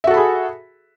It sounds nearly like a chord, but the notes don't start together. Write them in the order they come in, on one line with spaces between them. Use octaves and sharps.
E5 F#4 A4 B5 G#4